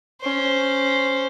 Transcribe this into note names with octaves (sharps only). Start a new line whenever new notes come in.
C#4 C5